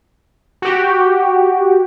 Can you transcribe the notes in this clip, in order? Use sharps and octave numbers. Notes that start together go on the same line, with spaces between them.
F#4 G4